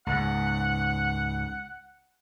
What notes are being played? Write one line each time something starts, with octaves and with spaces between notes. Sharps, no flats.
C#2 G#2 F#5